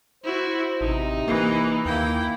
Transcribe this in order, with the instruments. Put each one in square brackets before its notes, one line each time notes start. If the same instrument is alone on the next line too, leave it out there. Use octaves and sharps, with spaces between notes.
[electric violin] E4 F#4 [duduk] C5
[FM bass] A1 [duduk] C3 [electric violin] D#4
[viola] E3 [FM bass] A#3
[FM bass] D#2 [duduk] A#3 [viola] E4 G5